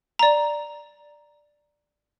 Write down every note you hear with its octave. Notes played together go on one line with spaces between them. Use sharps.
D5 A#5